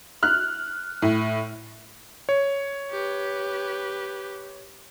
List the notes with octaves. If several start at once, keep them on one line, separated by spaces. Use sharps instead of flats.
F6 F#6
A2
C#5
G4 B4